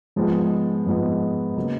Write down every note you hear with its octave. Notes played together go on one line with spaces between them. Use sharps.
G#2 F3 G#3 B3
G#2 F3 G#3 B3
C#3 F#3 A#3